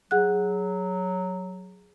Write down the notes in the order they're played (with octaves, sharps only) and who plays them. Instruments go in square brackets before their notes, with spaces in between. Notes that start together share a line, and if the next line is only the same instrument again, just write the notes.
[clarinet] F#3 [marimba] G#4 F#5 F#6